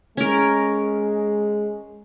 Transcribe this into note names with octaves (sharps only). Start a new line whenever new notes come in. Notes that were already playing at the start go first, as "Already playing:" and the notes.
G#3 C#4 A#4